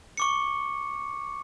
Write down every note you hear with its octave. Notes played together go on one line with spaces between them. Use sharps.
C#6 D6 C#7